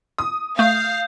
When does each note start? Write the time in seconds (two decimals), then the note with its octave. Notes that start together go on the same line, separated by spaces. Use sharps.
0.18 D#6
0.59 A3 F5 G6